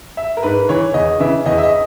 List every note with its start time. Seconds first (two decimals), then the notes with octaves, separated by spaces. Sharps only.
0.17 E5
0.37 A#4
0.43 G#2 B4
0.69 E3 C#5
0.94 E2 D#5
1.19 C#3 E3 E5
1.46 E2 D#5
1.58 E5
1.63 D#5